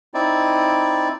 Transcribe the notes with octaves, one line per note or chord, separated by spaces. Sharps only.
C4 D#4 E4 D5